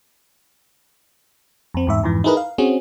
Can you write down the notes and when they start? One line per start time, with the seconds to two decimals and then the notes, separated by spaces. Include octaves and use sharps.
1.74 F2 C4
1.87 E2 G#2 E5
2.03 F2 G#2 E3
2.24 D#4 E4 G#4 A#4 B4 D#5
2.37 F5
2.58 C4 C#4 F#4 G#4